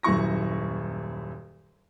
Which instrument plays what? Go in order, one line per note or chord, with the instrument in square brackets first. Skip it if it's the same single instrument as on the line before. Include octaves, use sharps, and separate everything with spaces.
[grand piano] D#1 F#2 E4 C#6 A#6